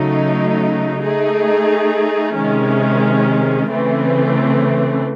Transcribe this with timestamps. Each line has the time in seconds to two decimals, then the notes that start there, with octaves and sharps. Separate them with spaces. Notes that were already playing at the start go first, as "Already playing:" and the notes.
Already playing: C#3 F#3 A3 D#4
1.03 A3 D#4 G#4
2.37 C3 D#3 G#3 C#4
3.70 C#3 E3 A3 C4